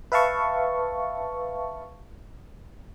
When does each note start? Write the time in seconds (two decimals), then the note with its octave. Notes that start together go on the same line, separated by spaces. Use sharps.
0.12 B4 E5 F5 A5 C#6